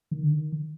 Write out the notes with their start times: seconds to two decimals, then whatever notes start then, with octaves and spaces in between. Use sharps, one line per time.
0.11 D#3
0.23 D3
0.33 D#3